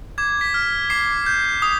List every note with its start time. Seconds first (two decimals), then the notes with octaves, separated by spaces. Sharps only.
0.18 D6 G#6
0.41 B6
0.54 F6
0.90 D6 C7
1.26 G6
1.62 D#6